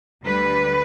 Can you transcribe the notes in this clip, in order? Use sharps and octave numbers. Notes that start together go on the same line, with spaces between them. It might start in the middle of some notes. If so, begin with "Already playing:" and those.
D2 D3 G3 B4